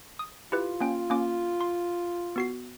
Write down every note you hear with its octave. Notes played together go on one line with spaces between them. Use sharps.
D#6
E4 F4 G4 B4
A#3 C#4 G5
A#3 C#4 D6
C6
B3 F#4 C7